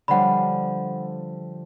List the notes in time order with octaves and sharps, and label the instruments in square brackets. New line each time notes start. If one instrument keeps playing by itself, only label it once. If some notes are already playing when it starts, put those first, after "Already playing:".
[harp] D3 F3 G3 [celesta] F#5 B5